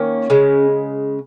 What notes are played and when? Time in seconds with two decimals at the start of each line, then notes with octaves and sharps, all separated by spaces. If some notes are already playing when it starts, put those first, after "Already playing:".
Already playing: D#3 A#3 C#4
0.30 C#3 G#3